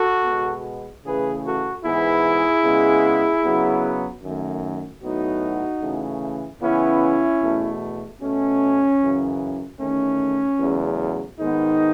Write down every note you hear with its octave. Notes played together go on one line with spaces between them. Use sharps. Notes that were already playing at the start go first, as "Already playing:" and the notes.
Already playing: F#4 A4
B2 G#3 B3
C#3 E3 A3 G#4 B4
F#4 A4
G#2 E3 B3 E4 G#4
C#3 G#3 B3
C#3 F#3 B3
F#2 D#3 A3
A2 F#3 B3 D#4 F#4
C#3 E3 A3
C#3 E3 B3 C#4 E4
E2 B2 A3
B2 A3 C#4
F#2 C#3 E3
E2 D#3 A3 C#4
E2 C#3 F#3 A3
G#2 D#3 G#3 B3 D#4